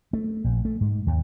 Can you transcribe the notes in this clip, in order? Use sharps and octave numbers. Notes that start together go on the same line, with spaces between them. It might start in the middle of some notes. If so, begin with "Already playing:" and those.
A3
A#1
A3
G#2
D#2